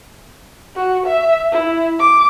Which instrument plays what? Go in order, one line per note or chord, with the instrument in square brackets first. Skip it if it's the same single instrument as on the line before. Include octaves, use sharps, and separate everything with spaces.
[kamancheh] F#4
E5
E4
D6